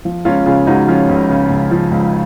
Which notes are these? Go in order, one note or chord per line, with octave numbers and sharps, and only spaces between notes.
F3
C#2 C#4 F4
C#3 F4 G#4
C#2 D#4 F#4
F3 C#4 F4
C#2
C#3
C#2
F3
C#2